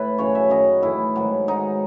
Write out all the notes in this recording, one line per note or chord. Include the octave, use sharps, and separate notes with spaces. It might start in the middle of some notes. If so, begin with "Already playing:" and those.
Already playing: A2 B4 E5
F#2 C#3 E3 C#5
E5
F#2 D#3 F#3 D#5
A2 E3 E4
G#2 D#3 F#3
G#2 F#3 D#4